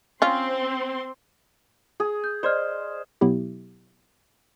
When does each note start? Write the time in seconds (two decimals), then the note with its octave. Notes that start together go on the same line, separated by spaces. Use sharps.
0.22 C4 C#4 F4 C6
2.00 G#4
2.24 G6
2.43 C5 D5 D#5 F6
3.21 B2 F#3 B3 E4 G4